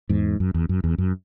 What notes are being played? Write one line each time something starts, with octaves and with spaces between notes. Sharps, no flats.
E2 G#2
F#2
E2
F#2
E2
F#2